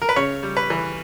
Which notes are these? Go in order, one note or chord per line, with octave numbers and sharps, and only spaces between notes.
A#4
B4
C#3 C#5
G3
B4
E3